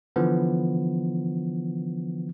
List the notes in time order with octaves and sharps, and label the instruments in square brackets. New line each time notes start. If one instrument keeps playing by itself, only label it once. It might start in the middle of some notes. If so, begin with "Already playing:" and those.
[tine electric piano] D3 E3 F3 B3